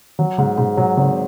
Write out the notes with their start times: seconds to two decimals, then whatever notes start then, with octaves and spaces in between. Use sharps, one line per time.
0.19 D#3 F#3
0.38 G#2 C#3
0.58 G#2 B2
0.77 B2 F#3
0.97 G#1 C#3